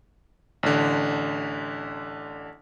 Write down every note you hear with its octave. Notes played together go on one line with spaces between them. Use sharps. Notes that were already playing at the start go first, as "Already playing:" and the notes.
A1 D3